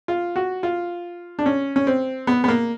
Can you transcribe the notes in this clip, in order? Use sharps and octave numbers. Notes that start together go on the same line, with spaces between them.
F4
F#4
F4
D4
C#4
C#4
C4
B3
B3
A#3